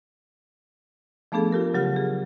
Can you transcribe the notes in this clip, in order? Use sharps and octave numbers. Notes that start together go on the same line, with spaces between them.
F3 A3 B3 D4 G#4 A4
F4 G4 A#4
C#3 F#3 G4 F6
G#4